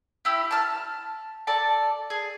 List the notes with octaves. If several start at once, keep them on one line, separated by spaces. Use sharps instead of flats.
E4 G4
A5 F6
A4 D5 A5
G#4